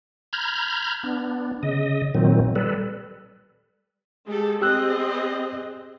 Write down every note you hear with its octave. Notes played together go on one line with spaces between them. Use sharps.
A#5 B5 F6 G6 G#6
B3 D4
C#3 D#5
A#2 D#3 F#3 C4
G3 A4 B4
G#3 G4 A4
C4 G4 G#4 D#5 E6 F#6